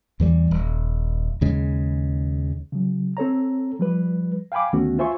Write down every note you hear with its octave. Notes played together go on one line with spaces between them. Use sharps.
E2 E3 G3
D#1
D#2 C#3 G#3
C#3 F#3
C4 A4 C#5 A#5
F3 G3 B4
F5 G5 G#5 B5 D6
D2 D#3 A3 B3 C#4 F#4
F4 C5 E5 G#5 C6 C#6